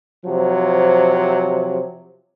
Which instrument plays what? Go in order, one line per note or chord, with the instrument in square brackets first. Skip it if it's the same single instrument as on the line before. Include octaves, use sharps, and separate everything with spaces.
[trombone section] C3 F3 F#3